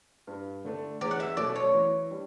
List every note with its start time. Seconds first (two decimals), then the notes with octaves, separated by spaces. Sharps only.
0.27 G2
0.65 D3 A3 D4
1.01 E2 D5
1.11 F#5
1.20 E5
1.37 B2 F#3 A3 D5
1.56 C#5
1.74 E3
2.11 G3 D4